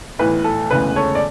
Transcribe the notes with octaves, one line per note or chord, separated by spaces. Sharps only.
B1 A2 E3 B4
A4
E1 D2 C#3 E3 B4
A4 C#5
D5